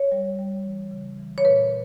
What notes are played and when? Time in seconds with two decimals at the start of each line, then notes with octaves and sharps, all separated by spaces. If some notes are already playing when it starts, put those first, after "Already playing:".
Already playing: C#5
0.12 G3
0.39 G3
0.65 E3
0.91 C#3
1.19 E3
1.38 C#5
1.45 A#2 B4